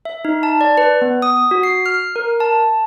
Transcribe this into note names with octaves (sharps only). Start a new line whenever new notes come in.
E5
D#4
A5
D5
B4
B3
D#6
F#4
C7
F6
A#4
A5